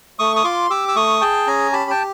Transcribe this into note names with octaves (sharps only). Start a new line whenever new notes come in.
A3 C#6 D#6
D#6
F4 C6 D6
G4 D6 E6
E6
A3 C#6 D#6
G#4 G5 A5
C#4 G#5 A#5
G4 A5 B5
G5 A5